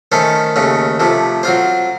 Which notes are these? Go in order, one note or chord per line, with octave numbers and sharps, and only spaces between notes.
D#3 A3 C#4 A4 C5
D#2 C#3 A3 C#4
C3 F3 A3
F#3 C4 F4 C5